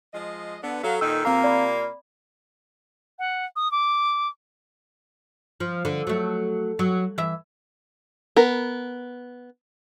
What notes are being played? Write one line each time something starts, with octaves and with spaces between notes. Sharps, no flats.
F3 G#3 D#5
D3 B3
F#3 A4 F5
A#2 D#3 D#4 E6
C3 A#3 C4 F4 F5 A#5
D5 B5
F#5
D#6
D6
F3
D3
F#3 A3
F#3
E3 E5
B3 A#4